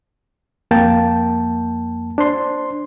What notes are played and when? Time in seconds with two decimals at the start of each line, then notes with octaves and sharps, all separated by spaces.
0.71 F2 A#3 G5 A5
2.18 D4 C5 C6